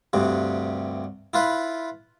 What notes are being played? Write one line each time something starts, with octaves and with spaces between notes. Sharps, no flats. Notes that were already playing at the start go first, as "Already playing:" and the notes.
D2 G2 C3
E4 F4 B4